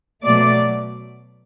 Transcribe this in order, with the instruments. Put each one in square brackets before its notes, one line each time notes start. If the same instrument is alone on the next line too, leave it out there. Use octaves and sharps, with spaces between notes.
[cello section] B2 F#3 A3 D5